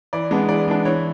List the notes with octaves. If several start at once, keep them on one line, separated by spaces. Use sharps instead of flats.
E3 D5
G#3 B3 D4
E3 D5
G#3 B3 D4
E3 C#5